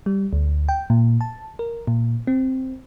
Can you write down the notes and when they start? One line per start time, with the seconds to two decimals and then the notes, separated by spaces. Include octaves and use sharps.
0.06 G3
0.33 D2
0.69 G5
0.90 A#2
1.21 A5
1.59 A#4
1.87 A#2
2.27 C4